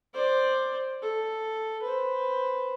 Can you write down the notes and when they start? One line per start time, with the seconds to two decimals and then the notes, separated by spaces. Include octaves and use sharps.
0.13 C5 D5
1.02 A4
1.82 B4 C5